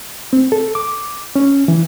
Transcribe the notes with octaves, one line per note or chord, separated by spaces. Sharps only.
C4
A4
D6
C#4
E3